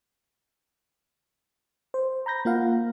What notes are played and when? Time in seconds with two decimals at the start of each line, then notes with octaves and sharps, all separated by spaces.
1.94 C5
2.26 A#5 B5 G6 A#6
2.45 A#3 F4 F5 F#5